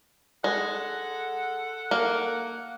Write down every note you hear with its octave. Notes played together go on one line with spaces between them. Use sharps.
G#3 A4 F#5
A#3